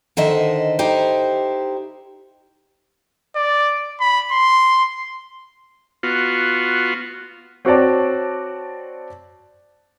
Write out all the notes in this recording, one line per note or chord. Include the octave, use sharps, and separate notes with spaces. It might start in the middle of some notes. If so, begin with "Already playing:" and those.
D3 D#3 C5 D#5 E5
D#4 E4 G4 C5
D5
B5
C6
B3 F4 F#4
C4 F#4 C#5 D5 A5